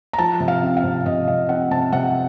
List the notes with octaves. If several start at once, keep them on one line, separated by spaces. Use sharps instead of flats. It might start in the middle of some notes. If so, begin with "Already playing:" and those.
A#5
F3 A5
C3
F5
C4
F5
C3
C3 D#5
C3 F5
C4 F#5
C3 A5
C3 F#5